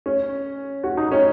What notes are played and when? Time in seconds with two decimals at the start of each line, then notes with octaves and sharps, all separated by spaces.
0.06 C#4
0.84 F#4
0.97 D#4
1.12 C#4